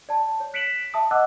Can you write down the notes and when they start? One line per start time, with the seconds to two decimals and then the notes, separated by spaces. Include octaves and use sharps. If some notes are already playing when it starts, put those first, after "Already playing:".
0.09 D5 A5
0.40 C#5
0.54 F#6 B6 C#7 D7 E7 F#7
0.94 E5 A5 D#6
1.11 D#5 F#5 D6 E6 F#6